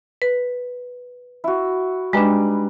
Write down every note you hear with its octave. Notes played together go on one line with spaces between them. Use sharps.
B4
E4 F#4
G3 G#3 D4 D#4 B4